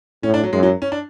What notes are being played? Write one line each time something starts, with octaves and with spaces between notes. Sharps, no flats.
A2 C#4
D4
F#3
F#2 G#3
F#3
C#4
D4